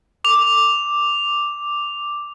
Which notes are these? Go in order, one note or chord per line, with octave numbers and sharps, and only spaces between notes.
D6 F7